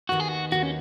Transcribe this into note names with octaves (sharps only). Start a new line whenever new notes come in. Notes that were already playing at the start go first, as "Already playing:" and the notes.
D#2 D#3 B3 F#4
G#4
F#4
D#2 D#3 B3 F#4
C#4